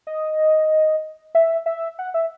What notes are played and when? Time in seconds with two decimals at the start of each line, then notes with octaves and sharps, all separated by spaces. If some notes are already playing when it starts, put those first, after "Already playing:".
0.07 D#5
1.35 E5
1.66 E5
1.99 F#5
2.14 E5